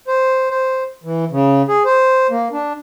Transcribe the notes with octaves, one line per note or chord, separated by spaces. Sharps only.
C5
C5
E3
C#3
G#4
C5
A#3
D4